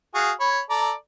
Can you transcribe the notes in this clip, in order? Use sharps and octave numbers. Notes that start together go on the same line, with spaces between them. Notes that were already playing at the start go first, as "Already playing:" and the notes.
F#4 G#4 F5
C#5 B5
A4 D5 A#5